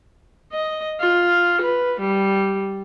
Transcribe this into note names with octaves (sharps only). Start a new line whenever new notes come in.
D#5
F4
B4
G3